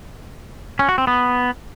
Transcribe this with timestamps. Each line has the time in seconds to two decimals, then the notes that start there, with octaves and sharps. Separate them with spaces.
0.79 C#4
0.89 F#4
0.98 C4
1.07 B3